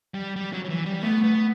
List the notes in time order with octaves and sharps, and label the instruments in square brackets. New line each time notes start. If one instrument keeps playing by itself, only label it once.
[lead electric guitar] G3
G3
F#3
F#3
E3
G3
[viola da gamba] A3 [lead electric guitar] B3
[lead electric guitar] B3